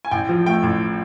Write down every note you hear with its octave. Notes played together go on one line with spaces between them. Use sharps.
G#5
A1 G5
F3
A3 G5
A1